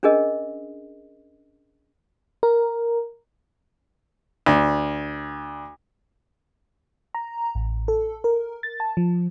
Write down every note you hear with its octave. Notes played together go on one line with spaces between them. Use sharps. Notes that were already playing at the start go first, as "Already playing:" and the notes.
C#4 D4 G#4 A#4 D#5
A#4
D2
A#5
A1
A4
A#4
A6
A5
F3